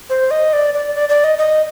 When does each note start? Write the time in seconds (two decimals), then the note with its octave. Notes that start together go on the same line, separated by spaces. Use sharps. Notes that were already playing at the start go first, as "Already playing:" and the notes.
0.10 C5
0.31 D#5
0.53 D5
0.74 D5
0.95 D5
1.09 D5
1.24 D#5
1.38 D#5